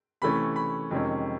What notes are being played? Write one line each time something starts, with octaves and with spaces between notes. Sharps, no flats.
C3 E3 A3 C#4 B5
B5
F2 C3 D#3 G#3 C#4